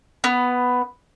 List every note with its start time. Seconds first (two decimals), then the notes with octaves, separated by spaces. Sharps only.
0.24 B3